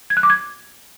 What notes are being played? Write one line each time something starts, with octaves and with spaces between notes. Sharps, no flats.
G#6
F#6
D6
G#6